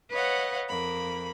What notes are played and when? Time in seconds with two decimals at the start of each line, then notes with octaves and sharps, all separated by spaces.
0.11 B4 C#5 D#5 F5 F#5
0.68 F2 A#3 B5